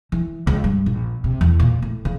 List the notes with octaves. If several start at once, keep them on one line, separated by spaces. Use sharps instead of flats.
E3
C#2
G2
A#1
C3
E2
A#2
A2
C#3